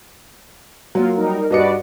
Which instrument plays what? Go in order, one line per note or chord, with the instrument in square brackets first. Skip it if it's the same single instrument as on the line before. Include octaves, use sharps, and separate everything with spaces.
[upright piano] F#3 [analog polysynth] A#3 F4
[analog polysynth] G3 D#4 A#4
[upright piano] G2 D#5 C#7 [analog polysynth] F#4 B4 D5